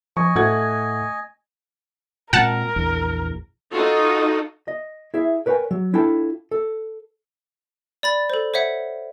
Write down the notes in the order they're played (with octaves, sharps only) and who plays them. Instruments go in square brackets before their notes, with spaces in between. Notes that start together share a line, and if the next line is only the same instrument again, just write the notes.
[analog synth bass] F3 [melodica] D#5 G#5 [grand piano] C#6
[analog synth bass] A2 [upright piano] A3 F#5 G#6
[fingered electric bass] A#2 G#3 C4 [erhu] A#4 [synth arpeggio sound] F#5 A5
[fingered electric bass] A#1 E2
[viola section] D#4 F4 F#4 A4
[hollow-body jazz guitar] D#5
E4 G#4 E5
A#4 B4 C#5 F5 G5 G#5
F#3
D4 E4 F4 A4 G5 A5
A4
[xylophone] D5 B5 A6
A4 C5
C5 C#5 E5 F#5